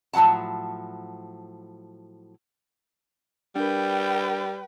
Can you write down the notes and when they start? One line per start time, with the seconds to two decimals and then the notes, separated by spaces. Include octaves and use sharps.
0.13 A2 F3 F#3 F#5 A5
3.56 G3 D4 A#4 B4 G5